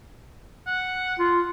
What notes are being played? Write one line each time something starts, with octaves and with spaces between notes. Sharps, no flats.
F#5
F4